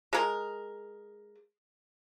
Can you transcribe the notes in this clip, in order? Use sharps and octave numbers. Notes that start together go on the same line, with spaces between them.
G#3 A#4